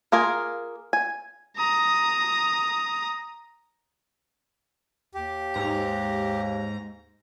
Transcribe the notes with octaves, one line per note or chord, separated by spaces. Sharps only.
A#3 F4 G#4 A#4
G#5
A#5 D#6
D#2 G4
G#2 A#5